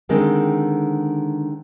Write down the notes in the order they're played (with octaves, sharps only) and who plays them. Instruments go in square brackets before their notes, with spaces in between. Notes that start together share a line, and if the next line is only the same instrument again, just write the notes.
[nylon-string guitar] D3 D#3 G#3 C4